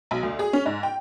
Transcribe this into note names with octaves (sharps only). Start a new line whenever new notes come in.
B1
D2
G#4
C#4
G#2
G5